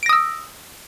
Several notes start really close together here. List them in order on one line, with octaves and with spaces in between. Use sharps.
D7 A#6 D#6 E6